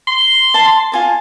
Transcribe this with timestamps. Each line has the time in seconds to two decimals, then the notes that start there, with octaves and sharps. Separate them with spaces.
0.08 C6
0.54 A5
0.92 F4 G#5 A5